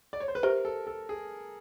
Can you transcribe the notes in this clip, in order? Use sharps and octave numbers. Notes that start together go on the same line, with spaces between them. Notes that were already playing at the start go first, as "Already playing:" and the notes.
D5
C#5
C5
B4
G4 A#4 C5 E5
A4
A4
G#4